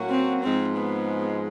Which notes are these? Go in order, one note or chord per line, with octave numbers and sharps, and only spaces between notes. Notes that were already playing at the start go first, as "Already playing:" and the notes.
Already playing: A2 F#3 A#3 C#4 F#4
C4
G#2 F3 G#3 C4
B3